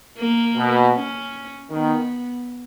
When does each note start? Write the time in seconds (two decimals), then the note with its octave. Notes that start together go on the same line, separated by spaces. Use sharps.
0.18 A#3
0.57 B2
0.95 C#4
1.71 D#3 B3